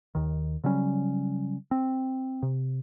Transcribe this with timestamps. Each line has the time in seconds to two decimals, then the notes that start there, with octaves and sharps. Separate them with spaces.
0.15 D#2 D#3
0.64 C#3 F#3 G3 C#4
1.71 C4
2.43 C3